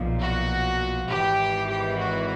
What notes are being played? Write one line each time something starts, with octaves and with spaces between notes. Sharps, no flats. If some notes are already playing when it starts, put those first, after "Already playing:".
Already playing: B1 A#2 F3
F#4
G#1 G#2 E3 G4
G4
F#4